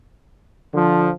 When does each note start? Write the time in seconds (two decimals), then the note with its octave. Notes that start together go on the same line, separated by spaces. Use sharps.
0.74 D3 F3